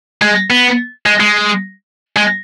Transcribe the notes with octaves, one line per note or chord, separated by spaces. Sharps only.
G#3
B3
G#3
G#3
G#3